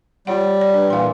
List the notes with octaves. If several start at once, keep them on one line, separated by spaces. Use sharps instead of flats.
G3 F4 C#5 F#5
D5
D4 B4
A#2 E3 F5 C6